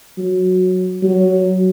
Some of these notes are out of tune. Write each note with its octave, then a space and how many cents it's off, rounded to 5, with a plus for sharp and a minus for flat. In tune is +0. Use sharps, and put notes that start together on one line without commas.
F#3 -10
F#3 +10